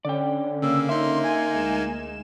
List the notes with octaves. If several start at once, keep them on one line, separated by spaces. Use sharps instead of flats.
D3 C#4 D5 G5
C#3 A#3 E6
A#3 D#4 E5 C6
G#5
D2 G#3 E7